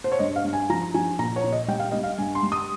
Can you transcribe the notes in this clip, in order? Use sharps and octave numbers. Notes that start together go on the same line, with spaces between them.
C5
C#5
G2 D#5
F5
G2
G#5
F3 A#5
F3 G#5
A#2 A#5
C#5
A#2
D#5
G3 G5
F5
G3 D#5
F5
G2 G#5
C6
G3
D#6